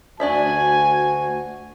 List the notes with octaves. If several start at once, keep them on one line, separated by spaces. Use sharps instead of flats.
D2 D4 F#4 D5 E5 G#5